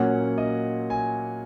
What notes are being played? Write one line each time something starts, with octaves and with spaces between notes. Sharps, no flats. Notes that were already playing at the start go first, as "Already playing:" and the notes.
Already playing: A#2 F#3 A#3 C#4 F#5
D#5
G#5